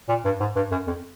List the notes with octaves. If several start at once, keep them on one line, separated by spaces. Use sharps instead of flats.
A#2
G2
G#2
G2
F#2
F2